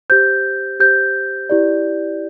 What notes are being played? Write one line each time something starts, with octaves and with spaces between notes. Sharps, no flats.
G4 C5 G6
G4 C5 G6
E4 G4 D5